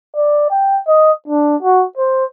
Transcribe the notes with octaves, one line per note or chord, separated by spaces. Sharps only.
D5
G5
D#5
D4
F#4
C5